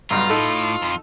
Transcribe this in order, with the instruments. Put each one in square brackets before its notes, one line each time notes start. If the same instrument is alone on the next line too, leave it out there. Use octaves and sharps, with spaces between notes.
[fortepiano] B1 G2 [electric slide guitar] F4 [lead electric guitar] A#5
[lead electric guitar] A2 [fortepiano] D#4 A4
[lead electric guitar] F2